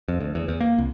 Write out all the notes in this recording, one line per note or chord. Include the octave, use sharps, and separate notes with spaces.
F2
D2
E2
E2
A#3
C2